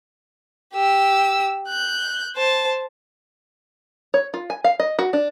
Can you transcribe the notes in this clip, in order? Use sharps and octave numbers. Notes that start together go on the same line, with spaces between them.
G4 E6
F#6 G6
C5 A5
C#5
F4
G#5
F5
D#5
F#4
D4